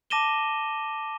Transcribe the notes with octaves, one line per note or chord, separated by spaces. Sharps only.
A5 D6 A#6 D#7 E7 G7